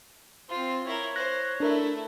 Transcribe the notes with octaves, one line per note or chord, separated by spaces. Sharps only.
C4 F4 C5
E4 A#4 C#5
C5 F#6 A#6
A3 D4 E4 A#4